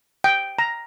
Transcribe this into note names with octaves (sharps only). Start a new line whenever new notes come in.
G5
A#5